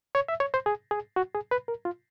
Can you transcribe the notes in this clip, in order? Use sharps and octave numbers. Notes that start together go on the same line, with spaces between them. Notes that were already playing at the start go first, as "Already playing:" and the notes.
C#5
E5
C#5
C5
G#4
G#4
F#4
G#4
B4
A#4
F4